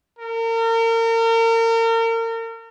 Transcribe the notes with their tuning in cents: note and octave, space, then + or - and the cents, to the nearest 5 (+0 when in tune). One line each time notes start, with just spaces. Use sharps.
A#4 -35